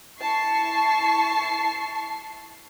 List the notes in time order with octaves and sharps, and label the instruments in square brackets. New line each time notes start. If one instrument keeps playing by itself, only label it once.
[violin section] E4 A5 C#6 C7